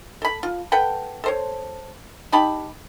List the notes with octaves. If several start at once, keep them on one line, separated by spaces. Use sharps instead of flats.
A4 B5
F4
A4 B4 F#5 G5
A4 C5 C#5
D#4 G4 A5 B5